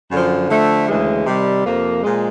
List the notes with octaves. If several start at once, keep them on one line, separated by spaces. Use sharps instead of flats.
F#2 D3 F3
D3 F3 A3
D2 C#3 E3 G#3
C3 D#3 G3
F2 C3 F3 A#3
A#2 F3 G#3